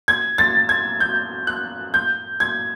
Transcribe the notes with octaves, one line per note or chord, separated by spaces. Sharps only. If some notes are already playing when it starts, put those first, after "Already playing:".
G#6
A6
G#6
G6
F#6
G6
G#6